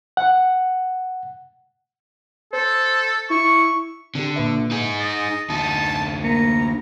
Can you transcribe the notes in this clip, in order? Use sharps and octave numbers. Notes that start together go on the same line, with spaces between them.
F#5
A4 C5
E4 C#6
D3 C4 G4
A#2 B4 E5
D#4 G#4
D#5 A6
D2 D#4 A5
A#3 A#5 C#7